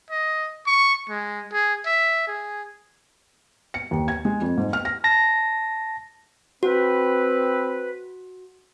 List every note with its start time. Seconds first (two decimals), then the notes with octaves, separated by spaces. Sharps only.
0.10 D#5
0.66 C#6
1.09 G#3
1.52 G#4
1.86 E5
2.27 G#4
3.74 C#7
3.91 D#2
4.08 G#6
4.25 G#3
4.42 F2
4.58 G#2
4.73 F6
4.85 A#6
5.04 A5 A#6
6.63 C4 F#4 B4